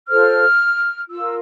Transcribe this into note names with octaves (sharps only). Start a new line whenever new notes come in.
F4 A4 C5 F6
F4 A#4 E6